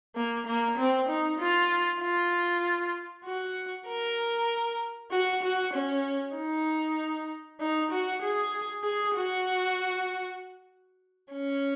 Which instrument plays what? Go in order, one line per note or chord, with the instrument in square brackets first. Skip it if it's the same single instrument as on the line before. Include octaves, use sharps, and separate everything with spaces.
[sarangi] A#3
A#3
C4
D#4
F4
F4
F#4
A#4
F#4
F#4
C#4
D#4
D#4
F#4
G#4
G#4
F#4
C#4